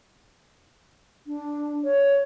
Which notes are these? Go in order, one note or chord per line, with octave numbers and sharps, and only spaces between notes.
D4
C#5